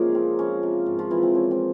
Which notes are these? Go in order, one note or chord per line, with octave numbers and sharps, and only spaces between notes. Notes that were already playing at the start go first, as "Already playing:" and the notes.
Already playing: C3 F3 G#3 A#3 C#4 F4 G#4 A#4
C4
F3 C#4
C3
G#2
F3 F4
E3 C4 E4
C4
F3 C#4
C4